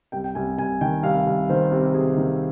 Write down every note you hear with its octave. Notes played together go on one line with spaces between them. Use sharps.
C2 G5
G5
C2 G#5
C2 G#5
D#3 G5
C2 F5
C2
D#3 C5
C3
C2 G#4
D#3